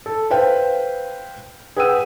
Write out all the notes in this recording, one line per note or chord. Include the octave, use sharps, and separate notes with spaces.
A4
B4 C5 F5 G5
G#4 B4 F#5 G5 E6 D#7